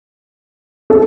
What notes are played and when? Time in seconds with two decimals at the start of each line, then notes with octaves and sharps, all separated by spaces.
0.90 A4